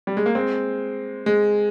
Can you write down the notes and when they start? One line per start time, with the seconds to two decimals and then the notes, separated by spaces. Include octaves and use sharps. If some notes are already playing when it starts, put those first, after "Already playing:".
0.07 G3
0.17 G#3
0.26 A#3
0.35 G#3 C4
1.26 G#3